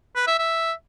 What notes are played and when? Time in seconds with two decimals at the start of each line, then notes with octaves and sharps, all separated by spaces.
0.15 B4
0.27 E5
0.39 E5